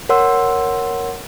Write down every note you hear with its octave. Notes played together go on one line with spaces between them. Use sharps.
A#4 C#5 F#5 C6 E6